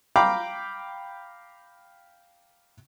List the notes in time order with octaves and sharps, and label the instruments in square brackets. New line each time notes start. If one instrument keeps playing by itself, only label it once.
[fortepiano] F5 G5 A#5 B5 D6